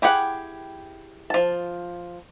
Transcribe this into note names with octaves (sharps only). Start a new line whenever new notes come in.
E4 G4 G#4 F#5
F3 A5